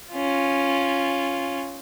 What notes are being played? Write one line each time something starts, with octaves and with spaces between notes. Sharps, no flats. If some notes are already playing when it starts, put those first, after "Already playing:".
C#4 F4